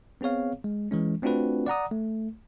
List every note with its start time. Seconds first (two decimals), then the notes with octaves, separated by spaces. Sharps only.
0.21 B3 C4 G#4 C#5 F5
0.64 G#3
0.91 E3 G#3 C#4
1.22 A3 C4 D4 F4 F#4 B4
1.67 D5 F#5 A#5 D#6
1.91 A3